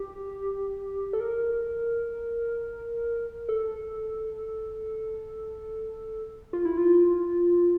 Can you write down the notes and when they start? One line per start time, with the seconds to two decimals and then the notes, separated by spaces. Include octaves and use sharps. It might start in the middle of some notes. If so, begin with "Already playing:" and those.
Already playing: G4
1.13 A4
1.20 A#4
3.49 A4
6.53 F4
6.65 E4
6.77 F4